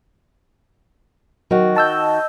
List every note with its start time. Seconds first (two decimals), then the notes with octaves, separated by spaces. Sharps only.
1.51 D#3 F#3 F#4
1.76 D#5 A5 E6 G6